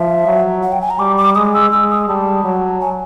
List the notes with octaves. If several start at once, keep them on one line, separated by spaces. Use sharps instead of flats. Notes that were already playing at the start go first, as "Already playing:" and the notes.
Already playing: F3 E5
F#3
F#5
G5
G#5
A#5
G3 D6
D6
G#3 D#6
E6
G#3 E6
D#6
G3 A5
F#3
G#5